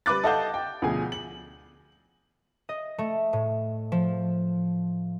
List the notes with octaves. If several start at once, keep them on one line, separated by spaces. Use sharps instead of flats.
G3 B4 B5 D6 F#6 A6
A4 D#5 F5 F#5 A5 G6
G5
D2 B2 F3 G#4 G#5
F#7
D#5
A3
A2
F3